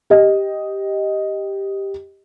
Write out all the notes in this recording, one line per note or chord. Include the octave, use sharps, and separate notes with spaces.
G4 D#5